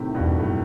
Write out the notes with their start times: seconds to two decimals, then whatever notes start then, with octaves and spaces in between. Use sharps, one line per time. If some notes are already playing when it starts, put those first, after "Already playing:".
Already playing: A2 C3 D#3
0.15 G2 B2
0.20 E2
0.38 F#2 A2